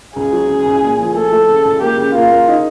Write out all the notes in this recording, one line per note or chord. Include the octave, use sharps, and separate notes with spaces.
C#2 G#4
F#3
C#3
C#2
A#2
F3
A3 A4
A3
C#3
C#2
A#3 G4
C#3
A#3 F4
A#3
D#4